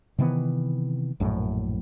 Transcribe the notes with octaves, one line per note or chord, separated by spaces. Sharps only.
C3 D#3 E3 B3
A#1 F#2 A2